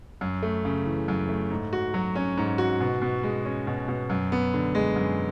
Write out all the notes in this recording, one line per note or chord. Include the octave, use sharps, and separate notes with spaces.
F#2
A3
C#3
E3
F#2
A3
G#2
F#4
F#3
C#4
G#2
F#4
B2
B2
G#3
C#4
B2
B2
F#2
B3
D3
G#3
F#2